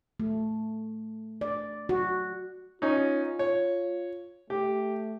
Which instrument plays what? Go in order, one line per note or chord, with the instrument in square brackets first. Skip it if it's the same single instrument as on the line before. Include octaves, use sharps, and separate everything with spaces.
[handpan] A3
D5
F#4
[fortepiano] C#4 D#4 [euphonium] F4
[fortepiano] C#5
[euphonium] A3 [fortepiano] G4